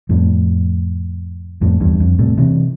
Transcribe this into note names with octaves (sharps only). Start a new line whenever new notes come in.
F2 A2
F2 A2
E2 G2
F2
A2 C3
C3 E3